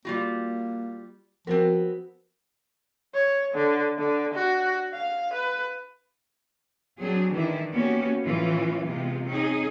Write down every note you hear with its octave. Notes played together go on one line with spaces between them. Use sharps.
G3 A#3 F4 F#4
F3 B3 C4 F#4 A#4
C#5
D3
D3
F#4
F5
B4
F#3 C4 D4 G#4
D#3 E3 G#3 D4 E4
A#3 B3 C#4 F#4 G4
A2 E3 F3 C#4 F4
C3 G#3 B3 F4
C4 C#4 D#4 G#4